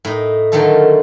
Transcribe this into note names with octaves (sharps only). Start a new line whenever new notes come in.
A2 D#4
D3 D#3 F#3 A3 F4 A4